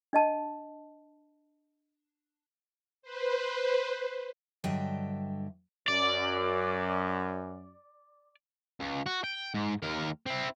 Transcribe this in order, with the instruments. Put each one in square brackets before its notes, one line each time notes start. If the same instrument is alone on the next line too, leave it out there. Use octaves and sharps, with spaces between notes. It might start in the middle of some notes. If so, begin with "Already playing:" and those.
[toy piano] D4 D#5 A5
[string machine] B4 C5
[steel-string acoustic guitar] G2 D3 F#3 D#5 E5 G5
[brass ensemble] F#2 [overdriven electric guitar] D5
[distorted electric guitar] C#2
F#4
G5
G#2
D#2 A#4
C4 E4